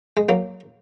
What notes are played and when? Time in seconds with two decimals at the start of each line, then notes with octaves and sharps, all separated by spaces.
0.17 G#3
0.29 F#3 A#3